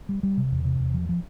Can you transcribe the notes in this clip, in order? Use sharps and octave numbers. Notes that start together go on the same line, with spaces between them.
G3
G3
C3
E2
C3
E2
F3
F3